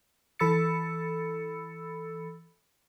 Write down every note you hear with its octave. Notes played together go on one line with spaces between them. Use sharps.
E3 A4 B5 E6 A6 C#7